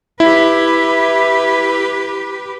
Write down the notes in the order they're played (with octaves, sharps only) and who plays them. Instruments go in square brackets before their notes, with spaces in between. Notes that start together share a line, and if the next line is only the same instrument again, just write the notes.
[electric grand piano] E4 [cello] G4 B4